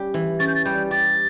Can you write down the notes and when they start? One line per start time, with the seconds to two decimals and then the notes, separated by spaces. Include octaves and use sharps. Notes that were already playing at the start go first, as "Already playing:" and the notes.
Already playing: G3 C#4 G4
0.14 E3
0.40 C#4 A6
0.47 G6
0.55 A6
0.65 G3 G6
0.91 G4 A6